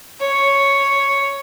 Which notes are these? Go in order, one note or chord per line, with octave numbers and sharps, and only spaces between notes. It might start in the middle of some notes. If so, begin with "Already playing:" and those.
C#5